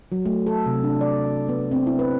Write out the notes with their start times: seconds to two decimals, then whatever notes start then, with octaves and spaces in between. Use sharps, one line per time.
0.12 F#3
0.25 A3
0.47 A4
0.66 C3
0.84 D4
1.01 D5
1.49 B3
1.72 C4
1.87 E4
1.99 B4